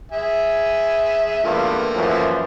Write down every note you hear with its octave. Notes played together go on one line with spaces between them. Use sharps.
G#4 E5 G#5
E2 G2 A3 A#3 F4
F#2 E3 F3